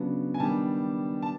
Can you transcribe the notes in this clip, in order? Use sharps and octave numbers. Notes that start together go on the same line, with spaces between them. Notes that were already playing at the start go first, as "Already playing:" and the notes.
Already playing: C#3 F#3 B3 D4
G#5
D#3 G3 B3 D4 A5
A5